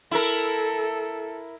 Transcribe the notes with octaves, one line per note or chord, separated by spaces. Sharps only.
E4 A4 A#4